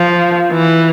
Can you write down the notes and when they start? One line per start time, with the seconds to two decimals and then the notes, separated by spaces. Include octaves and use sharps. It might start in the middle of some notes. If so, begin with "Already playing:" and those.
Already playing: F3
0.52 E3